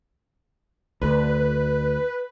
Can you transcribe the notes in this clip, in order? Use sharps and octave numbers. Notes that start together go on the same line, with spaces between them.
D2 B4